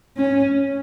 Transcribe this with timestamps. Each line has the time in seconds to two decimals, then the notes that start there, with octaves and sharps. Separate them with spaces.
0.17 C#4